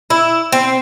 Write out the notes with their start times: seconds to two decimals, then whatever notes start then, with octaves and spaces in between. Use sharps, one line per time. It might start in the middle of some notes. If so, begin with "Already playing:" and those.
0.10 E4
0.52 C4